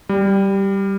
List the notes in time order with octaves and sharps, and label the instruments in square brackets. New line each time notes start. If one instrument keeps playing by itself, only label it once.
[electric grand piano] G3